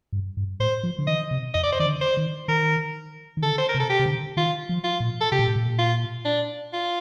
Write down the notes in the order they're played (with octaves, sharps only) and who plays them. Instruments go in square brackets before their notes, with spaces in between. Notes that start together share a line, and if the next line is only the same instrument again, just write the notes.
[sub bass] G2
G2
[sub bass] A2 [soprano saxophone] C5
[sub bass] F3
D3
[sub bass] D#3 [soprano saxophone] D#5
[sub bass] C3
[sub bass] F2 [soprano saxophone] D#5
[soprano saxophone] D5
C5
[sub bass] D#3 [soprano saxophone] D5
[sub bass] D3
[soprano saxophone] C5
[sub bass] D#3
[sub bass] D#3 [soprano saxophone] A#4
[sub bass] D#3
[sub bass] D3 [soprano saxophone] A4
[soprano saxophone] C5
A#4
[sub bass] C3
[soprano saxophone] A4
G4
[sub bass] C3
D3
[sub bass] D#3 [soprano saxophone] F4
[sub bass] F3
[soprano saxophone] F4
[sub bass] A#2
[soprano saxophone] A4
[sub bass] C3 [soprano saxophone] G4
[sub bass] A#2
A2
A#2
[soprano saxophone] F4
D4
F4